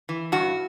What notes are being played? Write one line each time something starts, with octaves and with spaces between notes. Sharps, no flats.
E3
G2 F#4